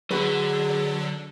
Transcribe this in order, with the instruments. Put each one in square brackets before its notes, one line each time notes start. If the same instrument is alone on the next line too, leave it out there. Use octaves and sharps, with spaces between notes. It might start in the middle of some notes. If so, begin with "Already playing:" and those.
[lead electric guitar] D3 [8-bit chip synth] F#3 [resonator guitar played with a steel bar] F#4 B4 [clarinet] G#4